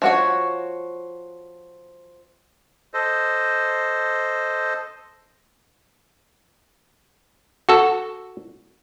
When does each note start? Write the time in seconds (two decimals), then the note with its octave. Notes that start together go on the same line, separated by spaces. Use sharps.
0.02 F3 F#4 C#5
2.94 A4 C5 D#5
7.69 F#4 A4